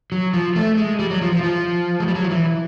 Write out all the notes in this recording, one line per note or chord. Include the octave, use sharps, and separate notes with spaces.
F#3
F3
A3
G#3
G3
F#3
F3
F3
F3
G#3
G3
F#3
F3
E3